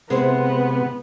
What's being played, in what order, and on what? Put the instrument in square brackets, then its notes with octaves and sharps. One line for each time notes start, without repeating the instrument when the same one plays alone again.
[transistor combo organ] C3 [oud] G#3 E4 C5 [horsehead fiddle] B3